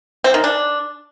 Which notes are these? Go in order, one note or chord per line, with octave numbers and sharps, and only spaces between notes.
C4
D#3
D4